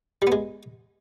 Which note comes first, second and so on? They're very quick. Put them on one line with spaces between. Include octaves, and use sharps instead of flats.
G3 B3 G#3